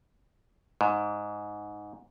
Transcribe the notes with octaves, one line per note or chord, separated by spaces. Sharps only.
G#2